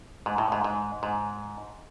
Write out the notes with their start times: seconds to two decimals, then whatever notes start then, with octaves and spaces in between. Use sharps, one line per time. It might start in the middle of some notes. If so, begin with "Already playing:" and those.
0.26 G#2
0.38 A2
0.52 G#2
0.64 G#2
1.03 G#2